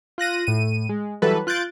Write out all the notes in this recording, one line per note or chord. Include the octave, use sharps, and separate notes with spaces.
F4 F#6 A#6 D#7
A2 D#7
G#3
E3 F#3 G3 A4 B4
F4 F#6 G6 A6 D7